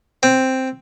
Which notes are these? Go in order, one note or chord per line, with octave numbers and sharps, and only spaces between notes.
C4